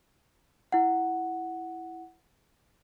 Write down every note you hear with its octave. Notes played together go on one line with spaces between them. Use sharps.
E4 F#5